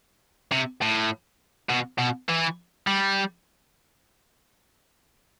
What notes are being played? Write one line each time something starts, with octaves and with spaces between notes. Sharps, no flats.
C3
A2
B2
B2
E3
G3